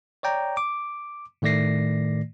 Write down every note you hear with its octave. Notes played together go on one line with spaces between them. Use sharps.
C#5 D5 G5 A#5
D6
A2 D#3 A3 D5 A#6 C7